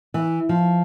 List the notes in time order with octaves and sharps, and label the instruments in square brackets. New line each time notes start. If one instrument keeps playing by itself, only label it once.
[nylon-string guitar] E3
F3